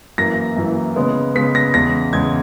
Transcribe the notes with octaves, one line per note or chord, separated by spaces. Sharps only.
F#2 E3 A#3 A#6
F#2 E3 A#3
C#3 G#3 B3
C#3 G#3 B3 B6
A#6
E2 C#3 G#3 A#6
E2 C#3 G#3 G#6